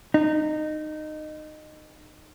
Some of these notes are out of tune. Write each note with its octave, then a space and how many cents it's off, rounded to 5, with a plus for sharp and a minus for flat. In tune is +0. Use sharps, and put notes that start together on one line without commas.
D#4 -20